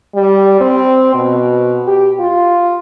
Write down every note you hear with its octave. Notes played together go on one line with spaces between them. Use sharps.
G3
C4
B2
G4
F4